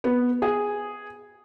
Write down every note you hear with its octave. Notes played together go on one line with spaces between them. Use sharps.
B3
G#4